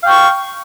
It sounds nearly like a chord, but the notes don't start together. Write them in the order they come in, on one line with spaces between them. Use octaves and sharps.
F5 G5 C#6